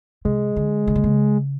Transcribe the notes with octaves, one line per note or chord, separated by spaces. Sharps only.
C3 G#3
D3
C#3
D3
C#3